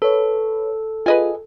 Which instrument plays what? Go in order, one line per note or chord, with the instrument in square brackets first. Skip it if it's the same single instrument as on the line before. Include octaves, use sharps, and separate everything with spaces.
[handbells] A4 [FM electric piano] B4 C#5
[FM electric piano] F4 G#4 [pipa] B4 D#5 G#5